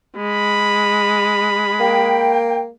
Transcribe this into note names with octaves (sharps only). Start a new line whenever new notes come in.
G#3 B5
A#3 G5